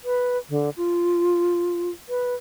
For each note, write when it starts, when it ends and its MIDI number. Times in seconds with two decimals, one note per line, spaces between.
0.05 0.38 71
0.49 0.70 50
0.77 1.90 65
2.09 2.35 71